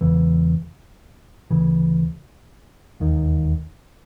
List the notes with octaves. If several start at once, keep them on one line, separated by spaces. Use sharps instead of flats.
E1 E2 C#3 E3
D2 C#3 E3
E1 D#2 D#3